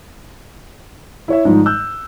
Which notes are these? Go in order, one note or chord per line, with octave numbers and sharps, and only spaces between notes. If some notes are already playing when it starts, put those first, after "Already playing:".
E4 C#5 E5
G#2 D#3 F3 G3 D#4
E6 F#6 G6